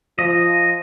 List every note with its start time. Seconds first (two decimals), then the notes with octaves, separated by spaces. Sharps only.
0.19 F3 D#5